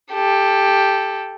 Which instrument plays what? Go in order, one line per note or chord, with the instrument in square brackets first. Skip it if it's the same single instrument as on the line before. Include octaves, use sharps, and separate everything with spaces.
[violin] G4 A4